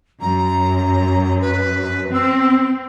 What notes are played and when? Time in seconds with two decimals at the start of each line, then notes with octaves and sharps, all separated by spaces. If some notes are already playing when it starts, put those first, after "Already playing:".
0.21 F#2 A#5
1.41 B4
2.14 C4 E6